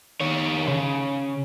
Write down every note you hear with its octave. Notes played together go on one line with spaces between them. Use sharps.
D#3 C#5
C#3